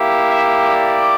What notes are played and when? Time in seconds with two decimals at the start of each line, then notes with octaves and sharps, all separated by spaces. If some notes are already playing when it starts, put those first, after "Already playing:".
Already playing: A#3 E4 G4
0.29 E5
0.69 D5